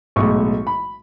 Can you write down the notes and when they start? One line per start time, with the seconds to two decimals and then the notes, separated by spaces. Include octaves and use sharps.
0.16 B1 A2 G#3 C#6
0.67 B5